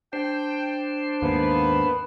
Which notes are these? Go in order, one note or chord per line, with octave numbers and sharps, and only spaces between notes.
D4 C5 G5
D#2 G#2 A#3 B3 B4